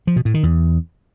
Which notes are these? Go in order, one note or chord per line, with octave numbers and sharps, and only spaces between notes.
F3
B2
A2
D#3
E2